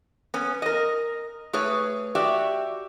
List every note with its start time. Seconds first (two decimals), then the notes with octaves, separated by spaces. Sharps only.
0.34 B3 C#4
0.62 A#4 D#5
1.53 A3 G#4 B4 C#5
2.15 F#4 G4 D5 E5